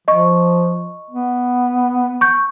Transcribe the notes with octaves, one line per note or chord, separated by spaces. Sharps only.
F3 D#5 C#6
B3
C#6 G6